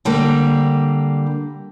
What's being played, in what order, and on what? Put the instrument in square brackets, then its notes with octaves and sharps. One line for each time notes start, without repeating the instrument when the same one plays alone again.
[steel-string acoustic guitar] D3 G3 A#3